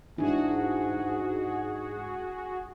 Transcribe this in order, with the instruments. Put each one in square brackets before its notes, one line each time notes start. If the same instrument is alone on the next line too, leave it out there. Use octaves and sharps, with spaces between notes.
[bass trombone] G#2 [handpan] D4 E4 [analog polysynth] F#4 G#4